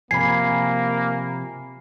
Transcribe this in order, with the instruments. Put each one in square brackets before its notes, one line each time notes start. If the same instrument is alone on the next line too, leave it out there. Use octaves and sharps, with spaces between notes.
[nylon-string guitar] C3 F3 [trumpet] A#3 [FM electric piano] G#5 B5 [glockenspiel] C7